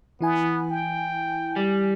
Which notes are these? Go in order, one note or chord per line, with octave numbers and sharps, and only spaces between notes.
E3 B3 E4 G#5
G5
G3